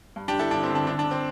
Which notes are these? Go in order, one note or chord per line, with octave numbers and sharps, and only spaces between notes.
G2
D4 G4
G1
E4 A4
G1 D4
C4 E4
D3
D4
D3 D4
D4
D3
C4